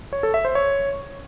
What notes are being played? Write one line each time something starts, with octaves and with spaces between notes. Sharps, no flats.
C#5
A4
E5
C5
C#5